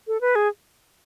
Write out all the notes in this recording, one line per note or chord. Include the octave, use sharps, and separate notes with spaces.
A4
B4
G#4